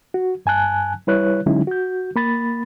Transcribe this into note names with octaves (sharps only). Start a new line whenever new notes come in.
F#4
G2 G#5 A5 F#6
G3 E4 B4 C#5 F#6
D3 F#3 G#3 C#4 D#4 E4
F#4 G6
A#3 B5 A6